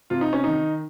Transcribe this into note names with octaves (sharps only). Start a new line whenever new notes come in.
C3 F4
D#4
C#4
D#3 D#4